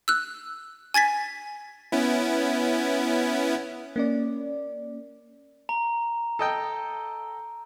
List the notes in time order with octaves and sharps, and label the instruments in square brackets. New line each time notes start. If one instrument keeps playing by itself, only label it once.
[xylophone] E6 F#6
G#5 G#6 A6 B6
[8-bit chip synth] B3 C#4 E4
[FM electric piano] A#3 C#4 D5
[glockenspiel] A#5
[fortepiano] A4 D#5 G5